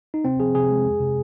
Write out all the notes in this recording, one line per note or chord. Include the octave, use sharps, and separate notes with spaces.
D#4
C3 C4
F3 G#4
C3 G#4
G#3
F2
C3